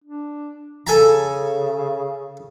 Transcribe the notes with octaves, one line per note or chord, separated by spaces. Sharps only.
D4
C#3 A4 G#5 A#5